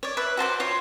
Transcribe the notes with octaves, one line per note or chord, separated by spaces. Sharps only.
C#5 D5
B4 E5
F#4 C5 A5 D6
F4 C#5